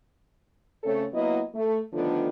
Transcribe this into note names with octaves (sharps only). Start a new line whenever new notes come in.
C#3 A3 C4 A4 C#5
F#3 A#3 B3 E4 D#5
A3
D3 D#3 F3 A3 B3 D4